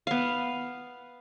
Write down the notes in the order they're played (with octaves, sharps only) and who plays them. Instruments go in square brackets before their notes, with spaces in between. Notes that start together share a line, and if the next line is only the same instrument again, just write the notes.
[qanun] B3 F5